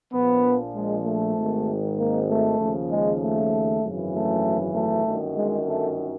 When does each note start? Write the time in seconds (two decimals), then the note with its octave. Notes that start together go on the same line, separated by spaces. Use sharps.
0.13 A#1 A#2 F3 B3
0.75 G#3
1.05 A3
1.36 G#1 G#2 D#3
1.98 A#3
2.29 A3
2.59 D#2 C#3 F3
2.90 G#3
3.21 A3
3.82 G#1 F#2 C#3 E3
4.14 A3
4.74 A3
5.05 G1 F#2 D#3
5.36 G#3
5.66 A3